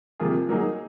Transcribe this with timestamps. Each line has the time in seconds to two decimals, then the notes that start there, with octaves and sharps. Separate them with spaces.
0.20 C3 F3 A#3 F4 G#4
0.49 F#3 A#3 D#4 G#4